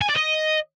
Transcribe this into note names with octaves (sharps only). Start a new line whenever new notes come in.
G#5
D5
D#5